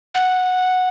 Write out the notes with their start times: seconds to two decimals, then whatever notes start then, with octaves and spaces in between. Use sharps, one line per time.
0.15 F#5